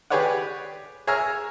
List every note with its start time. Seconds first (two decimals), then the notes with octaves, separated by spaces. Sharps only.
0.10 G4 G#4 B4 C#5 D5 F#5
1.07 G#4 C#5 E5 G#5 A#5 F6